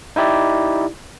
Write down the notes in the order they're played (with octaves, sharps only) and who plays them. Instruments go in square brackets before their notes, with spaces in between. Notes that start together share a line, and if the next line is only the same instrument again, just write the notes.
[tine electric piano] D#4 E4 G4 D5